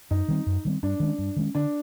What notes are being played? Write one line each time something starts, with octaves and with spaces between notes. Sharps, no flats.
F#2 D#4
D#3 G3 C4
F#2
D#3 G3 C4
G2 D4
D#3 G#3 C#4
G2
D#3 G#3 C#4
D3 D4